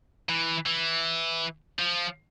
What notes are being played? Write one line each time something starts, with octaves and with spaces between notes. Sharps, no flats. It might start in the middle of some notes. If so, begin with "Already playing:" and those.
E3
E3
F3